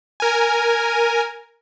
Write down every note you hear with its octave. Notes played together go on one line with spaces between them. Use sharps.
A#4 G#5